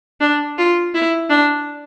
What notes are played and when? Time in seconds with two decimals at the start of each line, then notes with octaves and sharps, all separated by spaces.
0.21 D4
0.58 F4
0.94 E4
1.30 D4